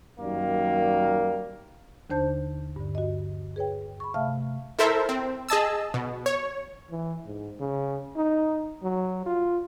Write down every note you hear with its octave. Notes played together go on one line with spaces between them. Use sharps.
F#2 D#3 G3 A#3
D#2 D3 D4 C5 A5 G6
G2 D3
F#4 D#5
G#4 B4 C#5 G5
B5 C#6
C3 A3 E5 F5 A5 F6
E4 A4 A#4 C5 E5
C4
G#4 D#5 A5 E6
B2
C#5
E3
G#2
C#3
D#4
F#3
F4